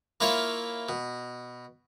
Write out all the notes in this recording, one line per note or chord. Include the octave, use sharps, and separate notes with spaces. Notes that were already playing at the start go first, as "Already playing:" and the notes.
A#3 E4 F4 C#5 E5
B2